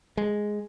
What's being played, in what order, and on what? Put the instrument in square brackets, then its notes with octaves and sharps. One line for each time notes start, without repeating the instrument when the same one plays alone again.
[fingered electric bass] G#3